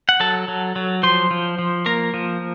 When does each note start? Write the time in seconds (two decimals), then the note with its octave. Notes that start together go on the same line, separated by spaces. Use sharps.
0.09 F#5
0.20 F#3 A4 A5
0.48 F#3
0.76 F#3
1.03 F3 C5 C6
1.31 F3
1.59 F3
1.86 A#3 A#4 A#5
2.14 F3